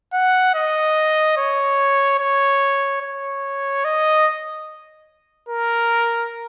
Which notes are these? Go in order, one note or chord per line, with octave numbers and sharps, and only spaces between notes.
F#5
D#5
C#5
C#5
C#5
D#5
A#4